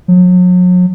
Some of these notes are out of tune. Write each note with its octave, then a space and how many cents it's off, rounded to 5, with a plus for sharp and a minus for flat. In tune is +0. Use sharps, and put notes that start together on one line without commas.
F#3 -40